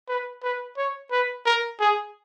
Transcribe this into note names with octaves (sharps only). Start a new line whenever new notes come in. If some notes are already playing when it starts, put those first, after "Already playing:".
B4
B4
C#5
B4
A#4
G#4